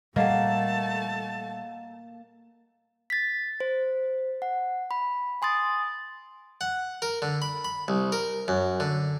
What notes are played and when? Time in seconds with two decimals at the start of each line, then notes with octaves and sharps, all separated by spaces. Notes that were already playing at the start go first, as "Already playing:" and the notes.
0.16 A#2 G3 A3 A#3 D#5 F5 F#5 A5
3.10 A6 B6
3.60 C5
4.42 F#5
4.91 B5
5.42 G#5 C6 D#6 A6
6.61 F#5
7.02 A#4
7.22 D3
7.42 B5
7.64 B5
7.88 C2
8.12 A#4
8.48 F#2
8.80 D3